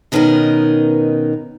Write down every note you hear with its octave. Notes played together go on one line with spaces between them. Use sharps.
B2 D#3 B3 C#4 D#4 A#4